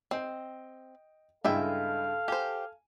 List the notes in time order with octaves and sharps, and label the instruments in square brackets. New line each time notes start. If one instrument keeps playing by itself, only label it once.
[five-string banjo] C4 [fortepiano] D#5 G5
[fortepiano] G2 C#3 E4 [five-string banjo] G#3 E5 G5 [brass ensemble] A4 F5
[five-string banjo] G4 C5 [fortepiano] G#5